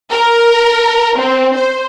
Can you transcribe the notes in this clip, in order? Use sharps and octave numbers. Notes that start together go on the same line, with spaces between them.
A#4
C4
C5